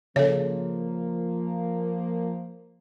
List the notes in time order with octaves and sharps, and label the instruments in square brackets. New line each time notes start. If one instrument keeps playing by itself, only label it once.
[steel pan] C#3 [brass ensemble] F3 A#3 [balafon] A4 C#5